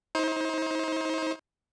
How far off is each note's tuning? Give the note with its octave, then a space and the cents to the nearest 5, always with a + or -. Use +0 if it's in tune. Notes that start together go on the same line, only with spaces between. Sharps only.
D#4 +40 C5 +25